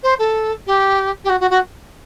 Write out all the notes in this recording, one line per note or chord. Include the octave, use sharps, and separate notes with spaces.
C5
A4
G4
G4
F#4
F#4
F#4